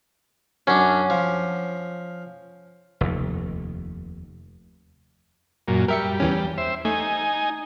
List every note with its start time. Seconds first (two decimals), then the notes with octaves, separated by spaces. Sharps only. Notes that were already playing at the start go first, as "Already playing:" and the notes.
0.67 F#2 C#4 D4
1.10 F3
3.01 F1 D#2
5.68 F#2 A#2
5.88 G3 A#4 E5 C#7
6.20 E2 E3 C#4
6.58 C5 E5
6.85 A3 D#4 G#5